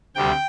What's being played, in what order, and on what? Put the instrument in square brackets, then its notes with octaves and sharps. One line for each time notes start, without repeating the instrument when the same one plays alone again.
[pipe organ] D2 C3 G3 G5